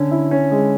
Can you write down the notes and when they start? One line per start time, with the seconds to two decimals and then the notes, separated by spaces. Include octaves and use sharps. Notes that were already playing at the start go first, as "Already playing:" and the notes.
Already playing: D3 C#4
0.11 E4
0.31 C#4
0.51 G#3